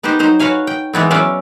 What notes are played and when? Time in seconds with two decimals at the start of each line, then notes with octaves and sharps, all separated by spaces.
0.03 B3 D#4 G4 B4 C5
0.19 F#3 D#4 C5
0.39 F#4 B4 C#5 F5 G#5
0.67 G5
0.93 E3 G#3 B3 C4
1.11 F#3 B3 C#4 D5 E5 F5